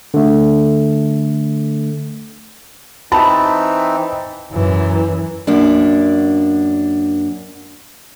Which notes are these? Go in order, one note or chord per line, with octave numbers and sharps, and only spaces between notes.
D3 A3
E3 C4 D#4 A5 B5
F#2 E3
F#2 A#3 D4